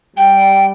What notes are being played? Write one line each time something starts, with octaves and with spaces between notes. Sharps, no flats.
G3 G5